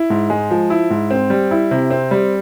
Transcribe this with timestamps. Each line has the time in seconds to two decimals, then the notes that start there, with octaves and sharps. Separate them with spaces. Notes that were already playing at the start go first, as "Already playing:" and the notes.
Already playing: E4
0.10 G#2
0.30 G#3
0.51 F3
0.70 E4
0.90 G#2
1.10 C4
1.30 G3
1.51 E4
1.71 C3
1.90 C4
2.11 G3